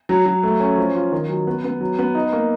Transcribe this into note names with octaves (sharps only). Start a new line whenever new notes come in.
F#3
F#3
A3
C#4
F3
F4
D#3
F#3
B3
B3
F#3
B3
D#4
A#3